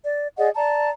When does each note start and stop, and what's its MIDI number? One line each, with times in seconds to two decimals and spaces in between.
0.05 0.28 74
0.37 0.49 68
0.37 0.49 74
0.37 0.49 75
0.37 0.49 78
0.55 0.90 74
0.55 0.90 81
0.55 0.90 82